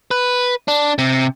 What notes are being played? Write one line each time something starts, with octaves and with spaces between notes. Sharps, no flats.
B4
D4
C3